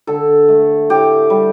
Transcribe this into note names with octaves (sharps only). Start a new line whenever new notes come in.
D3 A4
A3
A2 G4
G3